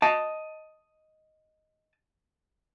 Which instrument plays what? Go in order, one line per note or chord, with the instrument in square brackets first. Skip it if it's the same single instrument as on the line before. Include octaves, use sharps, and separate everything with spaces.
[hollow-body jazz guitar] D#5 A5